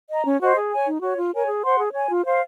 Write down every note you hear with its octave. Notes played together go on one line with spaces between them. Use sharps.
D#5 A#5
C#4
F#4 C5 D#5
G#4
C#5 G#5
D#4
F#4 C#5
F4
A#4 C#5 G#5
G#4
C5 F#5 C6
G#4
C#5 G#5
F4
C5 F5